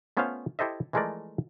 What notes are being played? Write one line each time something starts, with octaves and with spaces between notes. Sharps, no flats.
A3 B3 C#4 F4 C5 F5
E4 G4 A4 C5 D#5 E5
E3 F3 G#3 A3 A#4 D5